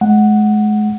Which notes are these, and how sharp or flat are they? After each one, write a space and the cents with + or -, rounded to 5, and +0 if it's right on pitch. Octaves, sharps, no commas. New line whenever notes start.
G#3 +35 F#5 +0